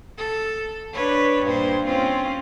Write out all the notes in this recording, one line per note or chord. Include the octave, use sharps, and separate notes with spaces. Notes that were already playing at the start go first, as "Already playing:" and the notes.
A4
D4 B4 C#5
G2 A#2 C5
C4 C#4 F4